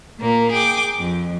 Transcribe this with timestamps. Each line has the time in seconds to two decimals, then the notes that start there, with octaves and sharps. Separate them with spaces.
0.18 A#2 A#3
0.51 G#4 G5 D6
0.98 F2